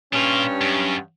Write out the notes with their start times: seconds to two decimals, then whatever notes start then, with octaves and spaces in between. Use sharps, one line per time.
0.13 G2 A#2 C#4 F4
0.61 F#2